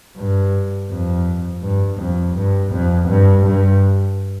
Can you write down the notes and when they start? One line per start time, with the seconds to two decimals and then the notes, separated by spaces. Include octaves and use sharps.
0.17 G2
0.90 F2
1.62 G2
1.99 F2
2.36 G2
2.72 F2
3.09 G2
3.46 G2